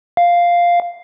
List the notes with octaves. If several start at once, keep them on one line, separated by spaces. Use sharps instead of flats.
F5